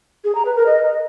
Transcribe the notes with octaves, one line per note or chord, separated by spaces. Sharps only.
G#4
A#5
B4
A#4
D#5